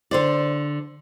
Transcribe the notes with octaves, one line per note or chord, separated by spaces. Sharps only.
D3 C5 D5